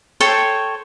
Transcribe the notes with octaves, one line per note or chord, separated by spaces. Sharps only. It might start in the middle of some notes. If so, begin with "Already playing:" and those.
A4 C5 C#5 G5